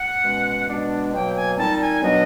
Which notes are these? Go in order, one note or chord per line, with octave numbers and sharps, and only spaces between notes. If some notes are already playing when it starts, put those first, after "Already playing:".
Already playing: F#5
B2 G#3 C#4
B2 G#3 B3 D4
B2 F#3 A#3 G5
G#5
A#2 G3 C4 D#4 A5
G#5
B2 F#3 B3 D4 D#5